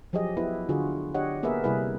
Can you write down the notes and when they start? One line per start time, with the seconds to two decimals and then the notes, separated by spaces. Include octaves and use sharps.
0.13 F3 F#3 G4 G#4 D#5
0.37 B3 E4 G4 B4
0.69 D3 F4 F#4 G#4
1.14 D4 G4 C#5 D#5 F#5
1.43 A#3 B3 G#4 A#4 B4 E5
1.64 C3 G3 E4 G#4 B4